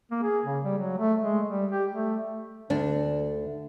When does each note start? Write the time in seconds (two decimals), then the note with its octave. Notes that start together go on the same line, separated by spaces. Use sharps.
0.11 A#3
0.23 G#4
0.45 C#3
0.64 G3
0.78 F#3
0.98 A3
1.23 G#3
1.50 G3
1.72 G4
1.92 A3
2.70 D2 D3 D4